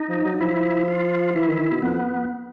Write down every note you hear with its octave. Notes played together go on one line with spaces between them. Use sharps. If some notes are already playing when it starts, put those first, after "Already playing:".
Already playing: D#4
F3
F#3
F3 E4
F4
E3 E4
D#3
D#3
B2
F2 B3